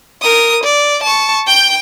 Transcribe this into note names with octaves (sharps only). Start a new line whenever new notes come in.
A#4 D#6
D5
A5 C#6
G5 G6